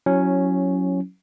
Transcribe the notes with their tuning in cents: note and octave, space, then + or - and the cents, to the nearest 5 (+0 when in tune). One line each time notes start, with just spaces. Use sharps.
F#3 -15 C#4 +0 E4 +0